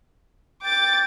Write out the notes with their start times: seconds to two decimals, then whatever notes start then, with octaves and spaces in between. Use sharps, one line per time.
0.63 G5 D6 A6